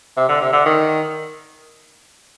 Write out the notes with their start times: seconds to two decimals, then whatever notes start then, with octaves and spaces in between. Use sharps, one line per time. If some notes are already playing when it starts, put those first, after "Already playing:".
0.17 C3
0.29 D3
0.41 C3
0.53 D3
0.66 D#3